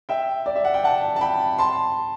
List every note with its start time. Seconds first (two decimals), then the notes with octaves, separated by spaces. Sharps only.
0.09 E5 G5
0.46 D5
0.55 E5
0.64 F#5
0.74 G5
0.84 F#5 A5
1.16 A5
1.21 G5 B5
1.58 A5 C6